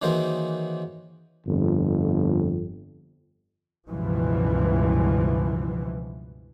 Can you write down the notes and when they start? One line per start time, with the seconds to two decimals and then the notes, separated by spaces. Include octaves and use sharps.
0.02 D#3 E3 F#3 A#3 G#4 C5
1.47 G1 F2
3.89 C#2 G2 B2 E3 F3